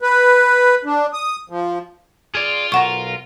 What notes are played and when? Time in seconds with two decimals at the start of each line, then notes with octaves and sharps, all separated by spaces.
0.02 B4
0.85 D4
1.13 D#6
1.50 F3
2.35 F4 G#4 D5
2.72 B1 A#4 F#5 C#6